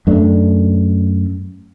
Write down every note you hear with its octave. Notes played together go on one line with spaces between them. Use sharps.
F#2 A3 D4